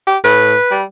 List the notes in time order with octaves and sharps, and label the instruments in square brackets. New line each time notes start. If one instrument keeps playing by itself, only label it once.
[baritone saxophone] G4
[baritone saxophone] A2 [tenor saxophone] B4
[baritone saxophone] G3